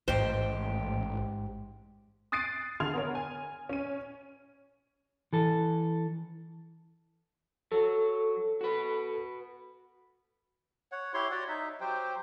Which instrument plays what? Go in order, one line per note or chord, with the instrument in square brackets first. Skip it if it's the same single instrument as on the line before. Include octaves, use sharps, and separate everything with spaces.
[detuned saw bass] A1 [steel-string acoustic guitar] G#2 G4 [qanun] C5
[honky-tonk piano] D#6 F#6 A6 C7 D7 D#7
D3 G#4 C6 F6 G#6 F7
B3 A#4 C#5
G#5
C#4 D#7
[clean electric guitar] E3 A4
[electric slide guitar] F#3 [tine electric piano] A4
[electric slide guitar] F#4 B4
[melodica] C#5 F#5
E4 G4 C#5 C6
F#4 C#5 D5 F#5
D#4 E5
F#3 G4 C5 G5